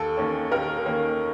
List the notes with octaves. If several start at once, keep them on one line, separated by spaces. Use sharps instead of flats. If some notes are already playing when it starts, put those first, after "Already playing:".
Already playing: D#2 A4
D#3 A#3 C#4
D#2 A#4
D#3 A#3 C#4